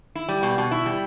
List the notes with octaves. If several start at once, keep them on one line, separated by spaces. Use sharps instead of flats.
E4
G3
B2
B2
E4
G3